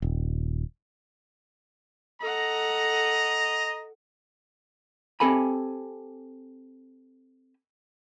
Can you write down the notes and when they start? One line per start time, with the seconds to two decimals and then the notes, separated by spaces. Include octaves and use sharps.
0.02 D#1
2.20 A4 D#5 F#5 A#5
5.20 C4 G4 A4 G#5 B5